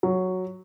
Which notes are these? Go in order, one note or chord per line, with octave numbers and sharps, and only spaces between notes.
F#3